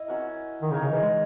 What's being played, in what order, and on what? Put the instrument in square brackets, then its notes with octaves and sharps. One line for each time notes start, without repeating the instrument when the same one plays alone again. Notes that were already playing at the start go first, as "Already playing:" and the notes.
Already playing: [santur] E4 D#5
C#4 F#4 A#4
[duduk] D#3
[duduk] C#3 [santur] D#4 A#4 C#5
[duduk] C#3
E3
G#3